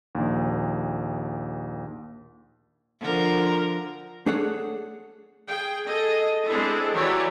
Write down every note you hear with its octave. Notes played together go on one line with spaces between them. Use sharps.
A#1 D#2
D3 F3 A#4
A3 D4 G#4 A4 C#5 F#5
G#4 G5
G#4 A4 D#5
G#3 C4 D4 E4 G#4 A4
E3 F#3 G4 C#5 D5